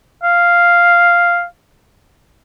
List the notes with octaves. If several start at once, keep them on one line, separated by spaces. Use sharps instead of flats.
F5